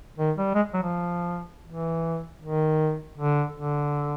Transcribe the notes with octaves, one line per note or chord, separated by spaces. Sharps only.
D#3
G3
G#3
F#3
F3
E3
D#3
D3
D3